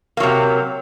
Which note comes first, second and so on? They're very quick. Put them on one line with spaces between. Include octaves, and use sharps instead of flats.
A#3 F#3 C3